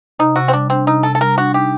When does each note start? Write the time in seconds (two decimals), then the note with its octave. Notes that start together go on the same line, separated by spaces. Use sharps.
0.19 C3 D#4
0.36 C3 F#4
0.48 C4
0.53 G3 D4
0.70 C4 D4
0.87 C3 D#4
1.03 C3 A4
1.15 A4
1.21 G3 A#4
1.38 D4 F#4
1.54 D#4 G4